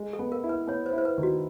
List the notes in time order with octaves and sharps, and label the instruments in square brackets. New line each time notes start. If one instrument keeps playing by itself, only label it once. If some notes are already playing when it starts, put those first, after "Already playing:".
Already playing: [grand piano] G#3
[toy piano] A4
[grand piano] B3
[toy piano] A#4
[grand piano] E4
[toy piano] B4
[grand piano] B3 [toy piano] C#5
[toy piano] C5
[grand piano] E4
[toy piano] C5
B4
[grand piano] D#3
[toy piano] F#4